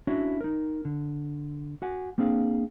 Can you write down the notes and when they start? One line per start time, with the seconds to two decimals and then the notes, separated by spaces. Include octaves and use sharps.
0.07 C#4 D4 E4 F#4 C#5
0.41 D#4 A#4
0.85 D3
1.82 F#4 F#5 G#5
2.18 A#3 C4 D4 G#4 F5